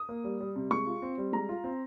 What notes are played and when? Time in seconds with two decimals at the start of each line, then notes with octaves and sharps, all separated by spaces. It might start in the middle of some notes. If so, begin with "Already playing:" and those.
Already playing: D#6
0.09 A#3
0.24 G3
0.40 G3
0.56 C3
0.71 G#3 C#6
0.86 F4
1.02 C4
1.18 G3
1.33 G#3 A#5
1.49 F4
1.64 C4